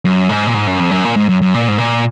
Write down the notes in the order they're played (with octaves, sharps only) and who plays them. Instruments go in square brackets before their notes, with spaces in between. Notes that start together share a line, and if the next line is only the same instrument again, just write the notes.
[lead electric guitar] F#2
G#2
A#2
G#2
F#2
F2
F#2
A#2
G#2
F#2
F#2
A#2
G#2
A#2